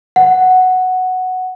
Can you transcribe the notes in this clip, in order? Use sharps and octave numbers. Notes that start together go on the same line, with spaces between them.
F#5